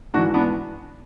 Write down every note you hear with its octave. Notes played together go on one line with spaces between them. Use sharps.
G#2 E3 D4 F#4
B3 D4